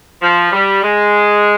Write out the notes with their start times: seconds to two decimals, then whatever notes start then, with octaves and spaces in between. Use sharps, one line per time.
0.22 F3
0.52 G3
0.83 G#3